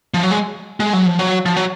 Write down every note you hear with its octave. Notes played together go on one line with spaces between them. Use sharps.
F3
F#3
G#3
G#3
F#3
F3
F#3
F3
F#3